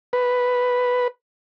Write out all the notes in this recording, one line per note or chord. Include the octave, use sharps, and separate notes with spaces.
B4